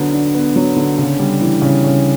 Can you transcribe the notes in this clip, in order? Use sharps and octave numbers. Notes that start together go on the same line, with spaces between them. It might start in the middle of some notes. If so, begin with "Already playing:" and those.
Already playing: D3 F#3 B3 D4
D4
B3
F#3
D3
C#3
G3
E3
C#3
C#3